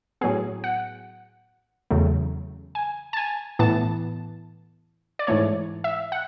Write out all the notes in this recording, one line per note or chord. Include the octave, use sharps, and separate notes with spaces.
A2 F#3 B3 G#4
F#5
E2 C#3 F#3 A3
G#5
A5
G#5
A2 E3 B3 A5
D5
G#2 E3 A3 C#5
E5
F#5